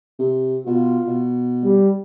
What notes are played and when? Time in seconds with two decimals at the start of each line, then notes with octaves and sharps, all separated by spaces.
0.19 C3
0.67 B2 F4
1.07 B2
1.63 G3